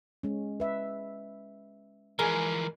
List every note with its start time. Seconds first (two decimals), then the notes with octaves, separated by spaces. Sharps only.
0.23 G#3 C#4
0.60 B4 E5
2.19 E3 F3 G#3 A#4